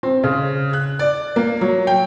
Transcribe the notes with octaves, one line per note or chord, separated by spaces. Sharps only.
C4
C#3
F#6
D5
A#3
F#3
G5